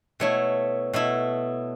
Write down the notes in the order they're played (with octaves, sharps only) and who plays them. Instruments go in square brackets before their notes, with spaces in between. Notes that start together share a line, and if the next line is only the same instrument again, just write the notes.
[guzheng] B2 A3 E4 [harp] C#5
[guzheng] B2 A3 E4